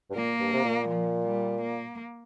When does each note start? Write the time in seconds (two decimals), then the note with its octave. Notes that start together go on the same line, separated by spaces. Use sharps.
0.10 G2
0.15 A#2 A#3
0.40 G2
0.53 C3
0.64 A#2
0.88 F3
1.25 G3
1.61 A#3